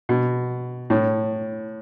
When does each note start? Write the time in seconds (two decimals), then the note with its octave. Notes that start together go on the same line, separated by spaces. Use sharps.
0.09 B2
0.90 A2